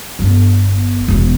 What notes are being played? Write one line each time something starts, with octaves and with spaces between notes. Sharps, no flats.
G1 B3
E1 B2